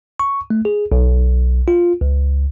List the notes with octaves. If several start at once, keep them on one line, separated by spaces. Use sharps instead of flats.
C#6
A3
G#4
B1
F4
C#2